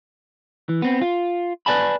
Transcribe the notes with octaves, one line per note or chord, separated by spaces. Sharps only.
E3
B3 C4
F4
B4 C5 D5 G#5 A5 B5